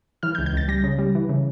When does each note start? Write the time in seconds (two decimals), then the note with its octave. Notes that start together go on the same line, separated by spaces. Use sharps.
0.23 E3 F6
0.35 G6
0.38 C#2
0.46 G6
0.53 C#2 A6
0.68 G3 A#6
0.84 C#3
0.99 G3
1.15 E3
1.29 C#3